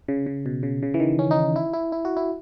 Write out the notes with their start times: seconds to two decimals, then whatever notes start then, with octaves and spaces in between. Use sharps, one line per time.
0.08 C#3
0.26 C#3
0.46 B2
0.63 C#3
0.83 C#3
0.94 E3
1.00 D#3
1.19 C#4
1.31 D#4
1.56 E4
1.73 E4
1.92 E4
2.05 F#4
2.17 E4